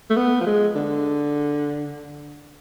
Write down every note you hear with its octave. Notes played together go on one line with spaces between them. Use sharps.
A3
B3
F3
G#3
D3